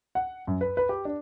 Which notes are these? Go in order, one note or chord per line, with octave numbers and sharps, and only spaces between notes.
F#5
F#2
B4
B4
G4
D4